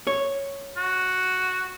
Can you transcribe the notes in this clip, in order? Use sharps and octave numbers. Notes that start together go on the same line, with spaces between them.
C#5
F#4